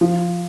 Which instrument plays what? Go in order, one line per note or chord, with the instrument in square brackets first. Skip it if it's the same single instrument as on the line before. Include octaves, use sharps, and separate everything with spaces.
[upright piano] F3